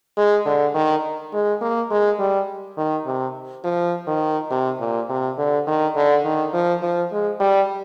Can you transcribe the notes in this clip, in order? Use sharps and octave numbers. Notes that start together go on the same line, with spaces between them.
G#3
D3
D#3
G#3
A#3
G#3
G3
D#3
C3
F3
D#3
C3
A#2
C3
D3
D#3
D3
D#3
F3
F3
G#3
G3